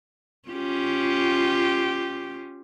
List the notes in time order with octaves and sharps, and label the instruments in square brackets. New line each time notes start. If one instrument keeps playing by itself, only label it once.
[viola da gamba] C#4 F4 G4